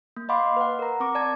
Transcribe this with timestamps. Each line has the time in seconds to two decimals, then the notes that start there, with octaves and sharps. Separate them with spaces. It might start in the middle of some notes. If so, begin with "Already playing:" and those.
0.16 A#3
0.29 D#5 F5 F#5 B5 C6 D6
0.56 B4 F#5
0.79 A#4 A#5
1.00 C4 C#6 D6
1.15 D5 A5 G#6